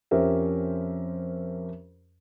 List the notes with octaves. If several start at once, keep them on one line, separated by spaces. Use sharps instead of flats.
F2 C#4 G4 A#4 C5 E5